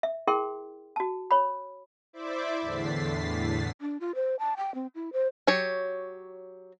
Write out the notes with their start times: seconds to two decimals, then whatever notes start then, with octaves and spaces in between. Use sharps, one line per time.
0.03 E5
0.27 E4 G#4 A#4 G5 C6
0.96 F#4 A5
1.31 C#5 B5
2.13 E4 C5 D5 E5 D6
2.61 E2 A2 D3 A6 B6 C7
3.81 D4
4.00 F4
4.15 C5
4.39 A5
4.57 G5
4.75 C4
4.95 E4
5.13 C5
5.47 F#3 G4 C#5